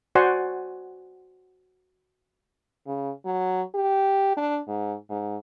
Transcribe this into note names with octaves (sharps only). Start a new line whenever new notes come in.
F#4 C5 D5 F#5 G#5 C6
C#3
F#3
G4
D4
G#2
G#2